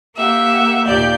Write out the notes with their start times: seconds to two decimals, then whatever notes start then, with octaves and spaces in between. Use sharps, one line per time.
0.16 A#3 G4 E5 F#5
0.86 D#2 A#2 G4 D5 G6